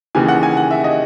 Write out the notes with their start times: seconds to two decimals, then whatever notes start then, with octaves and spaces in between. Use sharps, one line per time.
0.15 D#2 C#3 E3 G#5
0.28 F#5
0.43 G#5
0.57 F#5
0.71 E5
0.84 D#5